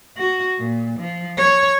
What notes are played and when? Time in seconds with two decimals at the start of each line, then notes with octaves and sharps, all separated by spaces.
0.17 F#4
0.59 A#2
0.99 F3
1.37 C#5